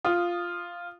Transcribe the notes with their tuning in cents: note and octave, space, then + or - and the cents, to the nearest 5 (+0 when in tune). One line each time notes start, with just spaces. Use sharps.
F4 +0 D#6 -10